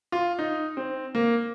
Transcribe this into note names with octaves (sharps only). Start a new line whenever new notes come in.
F4
D#4
C4
A#3